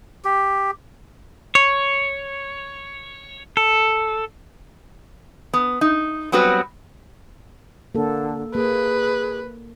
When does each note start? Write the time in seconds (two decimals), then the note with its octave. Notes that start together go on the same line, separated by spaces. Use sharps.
0.25 G4
1.55 C#5
3.57 A4
5.54 B3
5.81 D#4
6.32 F#3 G3 B3 C4 F#4 B4
7.95 D3 A#3 A4
8.55 A#3 G#4 B4